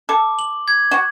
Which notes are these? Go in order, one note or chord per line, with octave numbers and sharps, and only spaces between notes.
A4 D6
F#7
G#6
F#4